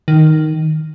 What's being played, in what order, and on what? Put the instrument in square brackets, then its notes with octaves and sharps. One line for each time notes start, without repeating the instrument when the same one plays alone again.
[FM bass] D#3